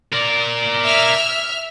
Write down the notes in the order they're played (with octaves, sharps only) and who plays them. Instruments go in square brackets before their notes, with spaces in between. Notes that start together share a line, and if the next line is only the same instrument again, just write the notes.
[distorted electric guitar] A#4 D5
[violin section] E5 F6